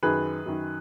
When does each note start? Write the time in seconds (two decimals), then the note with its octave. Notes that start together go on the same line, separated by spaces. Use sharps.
0.03 F#2 D#3 G#4 B4
0.46 F#2 D#3